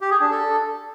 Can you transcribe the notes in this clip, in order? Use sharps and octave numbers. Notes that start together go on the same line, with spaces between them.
G4
G#4
D4
A4